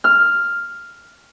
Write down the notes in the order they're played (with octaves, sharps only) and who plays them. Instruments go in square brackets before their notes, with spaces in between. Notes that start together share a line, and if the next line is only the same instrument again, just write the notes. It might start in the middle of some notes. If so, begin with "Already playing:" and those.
[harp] F6